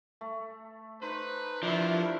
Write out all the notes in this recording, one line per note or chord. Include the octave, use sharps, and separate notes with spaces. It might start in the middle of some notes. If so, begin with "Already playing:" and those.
A3
D#4 B4 C5
G2 F3 D4 E4 A#4